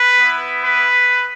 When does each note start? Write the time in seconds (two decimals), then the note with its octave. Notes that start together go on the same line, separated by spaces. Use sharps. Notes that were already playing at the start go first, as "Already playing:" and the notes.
Already playing: B4
0.19 B3 E4
0.64 B4